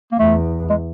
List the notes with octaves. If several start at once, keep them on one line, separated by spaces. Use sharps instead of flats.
A#3
E2 A3
G#3